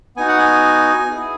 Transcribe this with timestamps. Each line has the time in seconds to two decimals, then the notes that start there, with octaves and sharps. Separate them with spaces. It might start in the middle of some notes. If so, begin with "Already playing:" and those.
0.16 B3 D#4 F#4 G#5
0.28 F#5
0.38 G#5
1.11 B3 E4 G#4